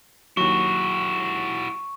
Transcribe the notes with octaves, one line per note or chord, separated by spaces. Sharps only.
D#2 F#3 E4 F#4 C#6